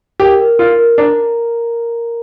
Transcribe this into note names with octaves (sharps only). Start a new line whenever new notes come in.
G4 A#4
A#4
F4 A#4
A#4
D4 A#5